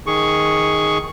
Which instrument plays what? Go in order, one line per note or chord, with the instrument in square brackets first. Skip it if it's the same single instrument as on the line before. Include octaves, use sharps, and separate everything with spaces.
[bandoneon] D#3 G#4 C#6